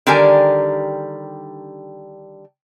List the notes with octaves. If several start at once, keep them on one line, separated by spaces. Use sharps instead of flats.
D3 D#3 G3 G4 A#4 G#5